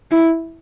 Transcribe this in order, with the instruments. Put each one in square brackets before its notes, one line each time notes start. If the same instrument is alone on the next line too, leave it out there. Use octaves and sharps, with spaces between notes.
[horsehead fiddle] E4